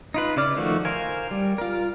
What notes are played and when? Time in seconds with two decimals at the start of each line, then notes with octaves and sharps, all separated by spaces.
0.14 D#4 F4 B4
0.36 C#3 E4 D5 F6
0.57 D#3 F3 A3 F#4
0.85 A#4 C5 F5 G#5
1.31 G3
1.58 F4 A#4